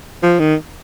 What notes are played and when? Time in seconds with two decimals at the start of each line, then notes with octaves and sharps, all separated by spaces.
0.23 F3
0.39 D#3